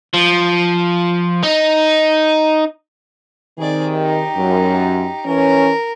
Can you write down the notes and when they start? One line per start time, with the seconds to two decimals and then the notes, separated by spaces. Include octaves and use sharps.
0.13 F3
1.43 D#4
3.59 C3 D#3 G#4 D5
3.98 D#4 G4
4.36 F#2
5.26 E3 C#4 A#4